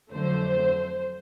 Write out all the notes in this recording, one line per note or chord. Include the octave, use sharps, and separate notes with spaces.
F2 D3 F#3 A3 C5